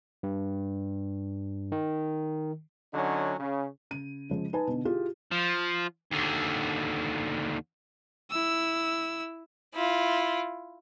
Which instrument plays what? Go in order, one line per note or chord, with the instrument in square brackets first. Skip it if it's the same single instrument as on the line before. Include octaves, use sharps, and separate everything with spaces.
[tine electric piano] G2
D#3
[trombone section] D3 F#3 C#4 D#4
C#3
[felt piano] C#3 D#7
C#3 F3 G#3
D#4 B4 G#5 A5
B2 D3
E4 F4 G4 G#4
[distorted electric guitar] F3
D#2 D3
[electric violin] E4 E6
[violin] E4 F4